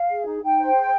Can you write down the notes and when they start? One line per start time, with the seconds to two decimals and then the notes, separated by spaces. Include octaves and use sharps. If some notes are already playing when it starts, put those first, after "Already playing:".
Already playing: F5
0.10 G#4
0.26 D#4
0.43 D#4 G5
0.59 C5
0.75 G#4